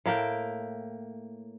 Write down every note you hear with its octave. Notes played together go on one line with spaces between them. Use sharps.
A2 A#3 E5 G5